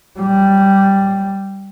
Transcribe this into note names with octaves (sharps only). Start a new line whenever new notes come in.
G3